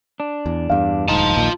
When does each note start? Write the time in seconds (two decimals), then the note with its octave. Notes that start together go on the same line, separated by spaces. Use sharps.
0.20 D4
0.46 E2
0.70 E2 G2 F5
1.08 E1 D2 G#2 D#4 F4 A5
1.36 A#1 D#2 A#2